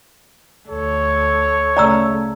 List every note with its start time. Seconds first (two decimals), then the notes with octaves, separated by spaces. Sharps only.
0.69 D2 A4 C#5
1.77 C#3 A3 D5 A#5 E6